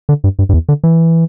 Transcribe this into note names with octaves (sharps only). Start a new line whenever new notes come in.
D3
G2
G2
G2
E2
D3
E3